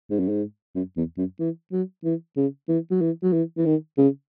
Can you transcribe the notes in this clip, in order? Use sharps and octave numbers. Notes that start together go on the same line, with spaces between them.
G#2
F#2
G#2
F#2
E2
F#2
E3
F#3
E3
C#3
E3
F#3
E3
F#3
E3
E3
D#3
C#3